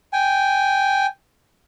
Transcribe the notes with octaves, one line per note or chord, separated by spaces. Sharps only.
G5 G#5